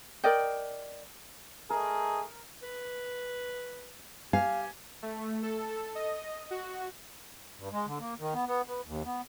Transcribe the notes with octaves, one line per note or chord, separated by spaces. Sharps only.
A#4 D5 D#5 G5
A3 G#4 A#4 D#5
B4
G4 F5 G#5
A3
A4
D#5
F#4
G2
G#3
D3
A#3
D#3
B3
B3
B3
D#2
B3